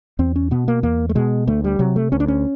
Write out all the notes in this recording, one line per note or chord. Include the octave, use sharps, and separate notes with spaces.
E2 C4
C#4
B2 B3
A#3
E2 A#3
A3
B2 G#3
D2 A3
G3
C3 F#3
A3
D2 C#4
D4
C#4